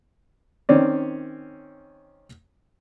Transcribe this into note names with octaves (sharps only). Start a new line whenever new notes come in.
D#3 C4 C#4 D5